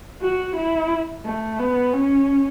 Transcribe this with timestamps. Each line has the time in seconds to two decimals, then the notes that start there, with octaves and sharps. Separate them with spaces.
0.22 F#4
0.56 E4
1.26 A3
1.59 B3
1.93 C#4